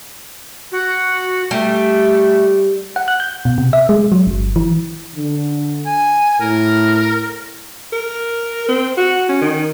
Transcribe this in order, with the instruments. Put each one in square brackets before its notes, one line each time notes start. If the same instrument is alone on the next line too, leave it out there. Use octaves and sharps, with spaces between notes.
[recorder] F#4
[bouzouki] G3 [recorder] A3
[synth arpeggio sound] F#5
F#6
G6
B2
C3
E5
G#3
F#3
G1
E3
[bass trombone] D3
[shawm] G#5
[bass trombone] A2 [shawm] A#4
[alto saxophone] A#4
C4
F#4
C#4
D#3